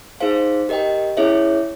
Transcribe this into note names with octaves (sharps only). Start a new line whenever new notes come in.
D#4 G#4 C5 F5
G4 A#4 D#5 G5
C#4 E4 G#4 C#5 E5